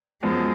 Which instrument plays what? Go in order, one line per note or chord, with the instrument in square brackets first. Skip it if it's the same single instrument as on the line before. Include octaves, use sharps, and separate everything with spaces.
[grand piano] F#2 F3 B3 [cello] G#3